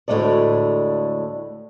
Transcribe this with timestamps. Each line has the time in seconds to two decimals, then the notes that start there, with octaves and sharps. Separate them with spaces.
0.08 D2 A2 E3 G#3 A4 D5